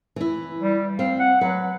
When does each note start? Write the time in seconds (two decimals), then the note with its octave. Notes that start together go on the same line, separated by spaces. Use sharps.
0.16 E3 E4
0.60 G3
0.99 C4 F5
1.19 F#5
1.41 F#3 B4